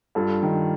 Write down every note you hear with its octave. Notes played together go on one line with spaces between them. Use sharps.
G2 F4 A4
D#3